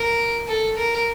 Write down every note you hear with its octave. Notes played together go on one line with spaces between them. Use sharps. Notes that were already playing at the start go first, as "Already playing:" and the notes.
Already playing: A#4
A4
A#4